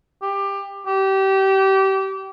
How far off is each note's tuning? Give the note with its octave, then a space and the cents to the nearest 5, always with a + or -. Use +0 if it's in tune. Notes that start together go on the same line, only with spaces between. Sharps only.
G4 +20
G4 -25